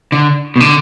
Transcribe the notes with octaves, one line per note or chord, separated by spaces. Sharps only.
D3
B2
D3